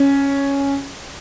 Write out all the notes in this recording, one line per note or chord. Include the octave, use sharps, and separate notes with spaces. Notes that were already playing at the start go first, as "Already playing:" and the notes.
Already playing: C#4